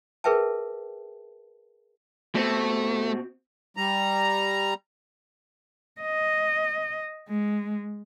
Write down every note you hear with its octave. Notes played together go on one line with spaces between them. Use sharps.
G#4 A#4 B4 E5 G5 A5
B2 A3 C4
G3 A#5
D#5
G#3